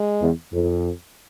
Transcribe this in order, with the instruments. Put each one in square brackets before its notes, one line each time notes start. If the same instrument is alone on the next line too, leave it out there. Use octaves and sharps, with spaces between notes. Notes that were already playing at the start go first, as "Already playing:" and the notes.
Already playing: [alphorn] G#3
[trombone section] E2
F2